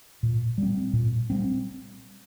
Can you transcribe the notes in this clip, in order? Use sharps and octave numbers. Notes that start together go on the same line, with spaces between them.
A#2
G3 C4
A#2
G3 C4